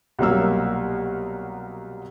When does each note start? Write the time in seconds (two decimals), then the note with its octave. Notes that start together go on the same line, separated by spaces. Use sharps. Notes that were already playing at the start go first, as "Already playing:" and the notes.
0.19 C2 B2 F#3 A#3 E6